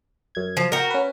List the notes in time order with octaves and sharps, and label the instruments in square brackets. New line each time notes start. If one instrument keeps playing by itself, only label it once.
[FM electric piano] F#2 G#6
[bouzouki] F3
[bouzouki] F#4 A#4 [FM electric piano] G5 A#5
[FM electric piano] C#4 B4